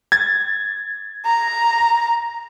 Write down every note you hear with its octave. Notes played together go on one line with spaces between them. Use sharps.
G#6 A6
A#5